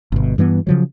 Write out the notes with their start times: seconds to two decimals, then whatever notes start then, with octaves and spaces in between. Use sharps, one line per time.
0.12 G1 B2
0.38 G2 E3 A3 B3
0.67 C#3 F3 F#3